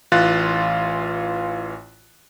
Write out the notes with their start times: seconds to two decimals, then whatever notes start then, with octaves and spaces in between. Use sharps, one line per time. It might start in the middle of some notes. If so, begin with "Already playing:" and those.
0.12 A1 E3 F4 F#6 A6